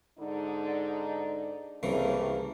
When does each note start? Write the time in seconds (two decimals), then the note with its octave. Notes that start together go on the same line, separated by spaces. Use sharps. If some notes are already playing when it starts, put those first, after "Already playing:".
0.19 G#2 D3 D#4
1.83 C2 A2 C#3 E3 A#3